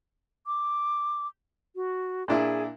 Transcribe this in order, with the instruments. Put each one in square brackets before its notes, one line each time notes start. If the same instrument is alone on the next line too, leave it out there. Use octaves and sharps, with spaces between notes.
[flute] D6
F#4
[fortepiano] A#2 D4 E4 [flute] G#4